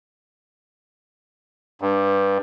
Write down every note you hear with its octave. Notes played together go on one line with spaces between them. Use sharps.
G2